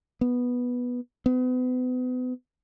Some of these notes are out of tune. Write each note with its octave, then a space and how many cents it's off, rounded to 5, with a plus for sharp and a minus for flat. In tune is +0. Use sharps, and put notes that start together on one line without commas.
B3 -5
B3 +35